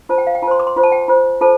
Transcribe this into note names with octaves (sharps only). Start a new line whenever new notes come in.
F4 C5 A5
G5
F5
G5
F4 A5
C5 C6
D6
C6
F4 C5
A5
G5
F4 C5
F4 A4 C5 A5